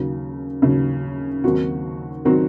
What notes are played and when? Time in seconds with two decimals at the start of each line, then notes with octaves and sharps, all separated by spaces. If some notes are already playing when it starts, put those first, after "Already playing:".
Already playing: D#2 C#3 F#3
0.62 D#2 C#3 F#3
1.44 D#2 D#3 F#3 C4 F#4
2.25 D#3 F#3 C4 F#4